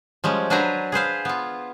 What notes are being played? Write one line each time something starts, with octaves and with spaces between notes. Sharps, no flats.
F3 G3 G#3 C#4
F#3 D4 B4 C5 G#5 A#5
G#4 B4 C5 F5
B3 F4